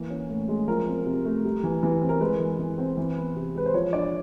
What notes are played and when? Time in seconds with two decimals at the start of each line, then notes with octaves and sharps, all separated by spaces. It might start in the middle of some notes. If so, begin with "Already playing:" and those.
Already playing: E3 A#3
0.10 C#4
0.29 A2
0.49 G#3
0.68 F3 A#4
0.86 C4
1.06 C3
1.25 A3
1.44 G3
1.64 E3
1.83 E3
2.02 C4
2.09 A#4
2.21 G#3 B4
2.39 E3
2.59 E3
2.78 C4
2.97 E3
3.16 B3
3.36 C3
3.55 G#3 B4
3.66 C5
3.74 F3 C#5
3.93 D4 D5